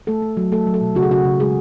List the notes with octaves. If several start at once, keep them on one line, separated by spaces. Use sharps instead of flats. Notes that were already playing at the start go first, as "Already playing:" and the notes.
A3 A4
A3
F#3
A3 A4
F#3
A4
B2
C#3 F#4
G#4
C#3 F#4
C#3
G#3 G#4